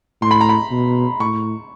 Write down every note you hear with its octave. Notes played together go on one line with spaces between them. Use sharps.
A2 C6
B5
A#5
B5
B2
A2 C#6